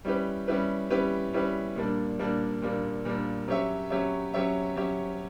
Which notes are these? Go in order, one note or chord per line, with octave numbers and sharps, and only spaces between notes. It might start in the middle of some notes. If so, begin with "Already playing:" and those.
G3 C#4 E4 G4 B4
G3 C#4 E4 G4 B4
G3 C#4 E4 G4 B4
G3 C#4 E4 G4 B4
A#2 G3 A#3 D4
A#2 G3 A#3 D4
A#2 G3 A#3 D4
A#2 G3 A#3 D4
F#3 C#4 G4 C#5 E5
F#3 C#4 G4 C#5 E5
F#3 C#4 G4 C#5 E5
F#3 C#4 G4 C#5 E5